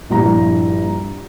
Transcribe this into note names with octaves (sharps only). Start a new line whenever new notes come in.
A#1 G2 F3 G3 E4 A#5